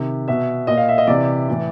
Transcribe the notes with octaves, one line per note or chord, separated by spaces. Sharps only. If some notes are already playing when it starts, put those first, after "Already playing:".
Already playing: C3 D#3
B2 E5
A#2 D#5
F5
E5
D#5
C3 E3 D5
A2 E3